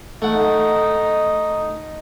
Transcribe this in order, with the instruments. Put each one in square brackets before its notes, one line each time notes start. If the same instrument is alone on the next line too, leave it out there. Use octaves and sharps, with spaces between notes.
[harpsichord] A3 F#5 [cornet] D#4